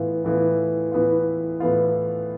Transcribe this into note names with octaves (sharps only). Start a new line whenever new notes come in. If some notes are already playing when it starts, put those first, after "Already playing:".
Already playing: A2 E3 B3 F4
A2 E3 B3 F4
A2 E3 B3 F4
A2 E3 B3 F4